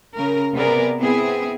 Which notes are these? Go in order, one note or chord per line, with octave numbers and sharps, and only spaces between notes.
C#3 A#4
C3 B3 G#4 A#4 D5
B3 C4 E4 G#4